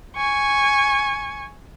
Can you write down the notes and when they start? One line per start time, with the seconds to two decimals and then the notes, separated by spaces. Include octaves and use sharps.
0.16 G#5 C#6